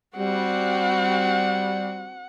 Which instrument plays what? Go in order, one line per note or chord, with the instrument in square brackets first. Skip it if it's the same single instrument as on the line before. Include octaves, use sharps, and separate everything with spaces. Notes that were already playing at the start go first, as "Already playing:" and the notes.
[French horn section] G3 [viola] C4 F#4 [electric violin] F#5